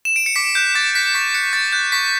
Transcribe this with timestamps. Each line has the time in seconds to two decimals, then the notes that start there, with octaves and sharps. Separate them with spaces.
0.05 E7
0.16 D7
0.26 C#7
0.36 D6 B6
0.55 F#6 G6
0.75 D6 A6
0.95 F#6 B6
1.14 C#6 B6
1.35 F#6 C#7
1.53 C#6 A6
1.72 F#6 G6
1.92 C#6 B6